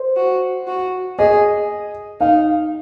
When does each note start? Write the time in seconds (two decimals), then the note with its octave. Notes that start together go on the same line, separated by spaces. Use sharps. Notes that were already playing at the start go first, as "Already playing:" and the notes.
Already playing: C5
0.16 F#4
0.68 F#4
1.19 G#4 D#5
2.21 D#4 F5